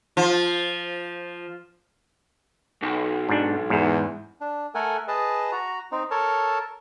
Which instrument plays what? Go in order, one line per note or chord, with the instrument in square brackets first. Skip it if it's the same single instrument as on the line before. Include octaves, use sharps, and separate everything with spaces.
[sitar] F3
[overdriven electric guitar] B1
[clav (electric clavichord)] G#2 D4
[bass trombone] E2 [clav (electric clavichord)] G#2
[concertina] D4
A3 A4 A#4 F#5 G#5
G#4 B4 D#5 A5
F#4 A#5
C4 D#4
A4 A#4 C#5 A5